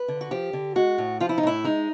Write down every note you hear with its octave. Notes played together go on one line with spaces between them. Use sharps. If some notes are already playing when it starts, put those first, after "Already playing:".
Already playing: B4
D3
F#4
F3 G4
D3
G#3 F#4
A2
F3 F4
E4
D#4
A2 E4
G#3 D#4